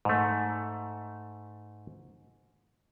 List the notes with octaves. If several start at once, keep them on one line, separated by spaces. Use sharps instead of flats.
G#2 A3